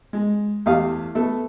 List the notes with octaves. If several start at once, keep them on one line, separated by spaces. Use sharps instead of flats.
G#3
E2 A3 G4 F5 D#6
A3 B3 A4